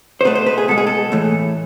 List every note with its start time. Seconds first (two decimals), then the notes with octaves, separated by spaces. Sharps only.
0.21 C5
0.25 B2 A3 B4
0.35 C5
0.46 B4
0.58 G#4
0.68 B2 G#3 A4
0.78 G#4
0.87 A4
1.12 A2 E3 A3